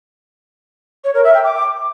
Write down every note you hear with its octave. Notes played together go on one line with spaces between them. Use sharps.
C#5
A#4
E5
G5
D6